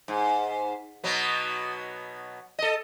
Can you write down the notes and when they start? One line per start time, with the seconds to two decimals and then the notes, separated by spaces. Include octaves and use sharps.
0.08 G#2
1.04 B2 F#3 B3
2.59 A4 D#5